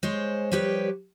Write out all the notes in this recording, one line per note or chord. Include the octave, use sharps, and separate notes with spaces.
G#3 C5 C#5
F3 G3 G4 B4 C#5